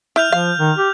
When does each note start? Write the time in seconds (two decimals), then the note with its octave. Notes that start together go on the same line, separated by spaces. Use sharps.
0.16 E4 F6 G6 F7
0.32 F3 F5
0.58 D#3
0.78 G4